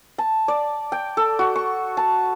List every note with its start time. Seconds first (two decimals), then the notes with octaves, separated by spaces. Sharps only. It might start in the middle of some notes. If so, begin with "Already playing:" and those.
0.18 A5
0.48 D5
0.92 G5
1.17 A4
1.39 F#4
1.56 C#6
1.97 A5